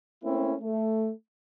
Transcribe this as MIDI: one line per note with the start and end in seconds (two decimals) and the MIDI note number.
0.24 0.55 57
0.24 0.55 58
0.24 0.55 60
0.24 0.55 61
0.24 0.55 64
0.62 1.10 57